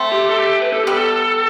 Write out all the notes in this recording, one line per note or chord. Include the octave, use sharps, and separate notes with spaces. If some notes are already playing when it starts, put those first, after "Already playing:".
Already playing: A3 C4
G4
A4
G4
B4
A4
G3 B3 G4
A4